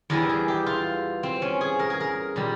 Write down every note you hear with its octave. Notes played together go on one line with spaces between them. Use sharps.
E2 E3 G3 A#4
G#4
G4
F4
C4
C#4
G#4
A#4
G#4
A#4
A#2 G3